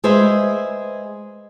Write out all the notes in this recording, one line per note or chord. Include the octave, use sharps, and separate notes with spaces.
G#3 G#4 B4 C5 D#5 E5